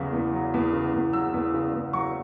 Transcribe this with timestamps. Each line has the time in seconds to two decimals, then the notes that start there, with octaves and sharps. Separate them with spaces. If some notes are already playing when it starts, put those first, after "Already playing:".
Already playing: E2 C#3 F#3
0.13 E2
0.33 F#3
0.54 E2
0.73 C#3
0.93 E2
1.13 F#3 E6
1.34 E2
1.54 C#3
1.73 E2
1.93 F#3 C#6